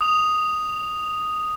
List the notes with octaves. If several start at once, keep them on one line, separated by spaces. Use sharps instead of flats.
D#6 F7